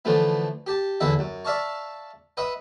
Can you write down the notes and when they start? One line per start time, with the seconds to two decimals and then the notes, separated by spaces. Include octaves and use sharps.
0.05 D3 E3 F3 A3 B3
0.67 G4 A5
1.00 E2 D3 E4 E5 F#5 A5
1.19 F#2
1.45 D5 E5 F5 A5 C#6
2.37 B4 D#5 E5 F#5